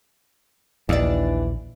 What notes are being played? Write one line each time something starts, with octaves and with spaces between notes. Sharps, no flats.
A#1 D#2 E3 D4 F4 D5